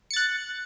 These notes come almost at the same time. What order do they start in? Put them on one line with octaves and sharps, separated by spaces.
C#7 A6 F#6